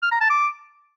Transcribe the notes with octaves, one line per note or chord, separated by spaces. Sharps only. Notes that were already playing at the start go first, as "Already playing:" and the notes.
F6
A#5
A5
D6